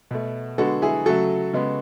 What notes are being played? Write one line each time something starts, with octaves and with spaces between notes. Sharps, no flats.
B2 A3
D3 G#3 B3 F#4 A4
E4 G#4
C#3 F#3 A3 F#4 A4
C#3 G#3 B3